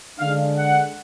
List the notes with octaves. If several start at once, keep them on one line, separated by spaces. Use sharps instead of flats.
D3 G#3 D4 F5
F#5